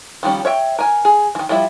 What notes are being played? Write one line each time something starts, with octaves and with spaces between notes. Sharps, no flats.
D#3 F3 G3 C#4
C#5 E5 G5
A#4 G#5
G#4
D#3 E3
F3 G3 E4 E5